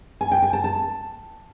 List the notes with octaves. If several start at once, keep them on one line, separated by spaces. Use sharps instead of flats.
G#5
G5
G#5
A5
A5